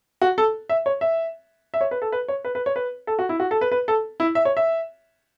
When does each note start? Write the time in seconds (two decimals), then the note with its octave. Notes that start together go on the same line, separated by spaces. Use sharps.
0.21 F#4
0.38 A4
0.69 E5
0.86 C#5
1.01 E5
1.74 E5
1.81 C#5
1.91 B4
2.02 A4
2.12 B4
2.28 C#5
2.45 B4
2.55 B4
2.66 C#5
2.76 B4
3.07 A4
3.19 F#4
3.29 E4
3.40 F#4
3.51 A4
3.61 B4
3.72 B4
3.88 A4
4.20 E4
4.35 E5
4.45 C#5
4.57 E5